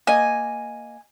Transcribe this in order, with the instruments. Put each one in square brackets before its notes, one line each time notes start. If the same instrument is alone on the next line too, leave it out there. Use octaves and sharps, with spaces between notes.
[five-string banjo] A#3 D#5 [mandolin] G#5